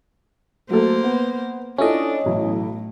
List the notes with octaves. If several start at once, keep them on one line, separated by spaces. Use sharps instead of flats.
F#3 A3 A#3 A4 C5
B3
C#4 D4 E4 F4 A4 D#5
B1 A2 E3 E4